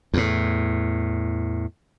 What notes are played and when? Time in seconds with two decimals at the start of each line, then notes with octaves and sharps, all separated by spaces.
0.14 E2 A2